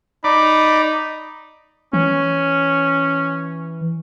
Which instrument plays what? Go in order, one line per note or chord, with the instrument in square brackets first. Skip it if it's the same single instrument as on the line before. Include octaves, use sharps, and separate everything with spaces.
[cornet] D#4 [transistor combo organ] D5 [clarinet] B5
[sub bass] E3 [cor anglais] C#4